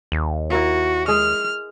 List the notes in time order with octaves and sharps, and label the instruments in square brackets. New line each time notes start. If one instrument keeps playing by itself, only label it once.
[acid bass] D#2
[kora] E4 A#4 F5 [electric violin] F#4
[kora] G#3 G#4 [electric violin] F6